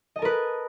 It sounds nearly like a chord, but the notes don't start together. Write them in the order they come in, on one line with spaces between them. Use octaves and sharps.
D#5 A5 A#4 B4